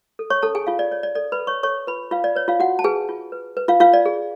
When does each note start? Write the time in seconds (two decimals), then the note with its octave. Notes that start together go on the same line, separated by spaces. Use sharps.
0.19 A4
0.30 C#5 C#6
0.43 C#4 A4 A5
0.55 G#4 G#5
0.67 F4 F5
0.79 D5
0.91 C#5 D5
1.03 D5
1.15 A4 D5
1.32 B4 B5
1.39 A4
1.47 C#5 C#6
1.63 A4 C#5 C#6
1.87 F4 B4 B5
2.11 F4 B4 F5
2.24 D5
2.35 B4 C#5
2.48 F4 F5
2.60 F4 F#4 F#5
2.79 A5
2.84 G#4 B4 G#5
3.09 F4
3.32 B4
3.57 B4
3.68 F4 F5
3.80 F4 B4 F5
3.93 D5
4.06 G#4